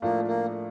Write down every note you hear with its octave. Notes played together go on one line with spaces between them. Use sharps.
A2 F3 A3 A#3 D4 F4
A#3